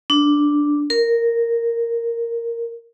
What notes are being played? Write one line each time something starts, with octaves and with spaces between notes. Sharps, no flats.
D4
A#4